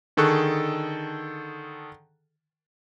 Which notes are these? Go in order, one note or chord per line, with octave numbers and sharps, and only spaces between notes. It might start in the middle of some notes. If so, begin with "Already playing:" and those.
D3 D#3 G#4 A4 C#6 F#6